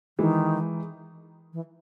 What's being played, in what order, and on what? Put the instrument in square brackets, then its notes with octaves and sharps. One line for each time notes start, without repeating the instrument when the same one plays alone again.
[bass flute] D#3 [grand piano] E3 G#3
[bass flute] E3